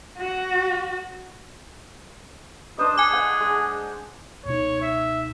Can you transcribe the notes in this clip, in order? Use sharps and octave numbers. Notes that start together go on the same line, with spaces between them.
F#4
D4 C5 D#5 D#6
G#4 G#5 D6
F#5
G#3
C#2 B2 D#4 C#5
E5